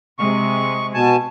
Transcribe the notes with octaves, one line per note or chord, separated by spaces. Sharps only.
C3 G#3 C#6
B2 G#5 A5